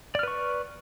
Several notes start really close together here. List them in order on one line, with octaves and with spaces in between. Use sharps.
D5 F6 B4 C#6